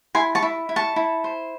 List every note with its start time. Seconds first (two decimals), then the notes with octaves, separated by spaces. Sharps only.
0.15 E4 G#5 C6
0.35 A5 C#6
0.42 E4
0.69 E4
0.76 A5 C#6
0.96 E4
1.24 C5